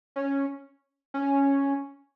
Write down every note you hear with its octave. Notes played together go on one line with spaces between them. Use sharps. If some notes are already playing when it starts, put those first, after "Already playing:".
C#4
C#4